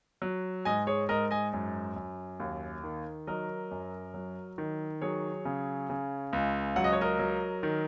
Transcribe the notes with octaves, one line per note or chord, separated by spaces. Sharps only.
F#3
G#2 D#5 G#5
G#4 C#5
G#2 A#4 D#5
D#5 G#5
F#2
F#2
D#2
D#3
F#3 A#4 D#5
F#2
F#3
D#3
F#3 G#4 C#5
C#3
C#3
C#2
F#3 F#5
D#5
C#5
A#4 D#5
F#3
D#3